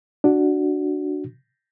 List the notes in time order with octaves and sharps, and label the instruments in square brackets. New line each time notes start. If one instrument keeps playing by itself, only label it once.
[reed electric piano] D4 F#4